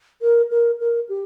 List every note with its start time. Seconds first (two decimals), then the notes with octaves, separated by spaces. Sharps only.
0.22 A#4
0.51 A#4
0.80 A#4
1.09 G4